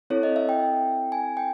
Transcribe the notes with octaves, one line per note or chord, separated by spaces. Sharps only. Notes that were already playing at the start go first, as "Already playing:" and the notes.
C4 E4 A4 C#5
D#5
E5
G5
G#5
G5